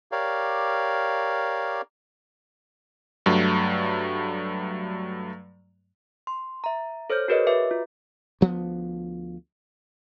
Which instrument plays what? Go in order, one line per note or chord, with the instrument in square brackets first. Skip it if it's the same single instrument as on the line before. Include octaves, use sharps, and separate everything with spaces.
[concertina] G4 A#4 C#5 D5 F5
[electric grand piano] G2 F#3 A3
[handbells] C6
E5 A#5
A4 C5 C#5 F6 G6
F#4 G#4 A#4 B4 C#5 D#5
F#4 B4 E5 D6
F4
[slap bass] D2 F3 B3